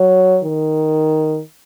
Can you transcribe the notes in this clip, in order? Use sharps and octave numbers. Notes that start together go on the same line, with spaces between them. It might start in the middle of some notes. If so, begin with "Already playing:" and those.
Already playing: F#3
D#3